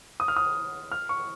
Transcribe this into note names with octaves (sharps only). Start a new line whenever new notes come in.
D#6
F6
D#6
F6
C#6